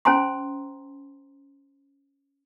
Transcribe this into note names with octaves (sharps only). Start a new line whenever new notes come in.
C#4 C5 G#5 A#5 C6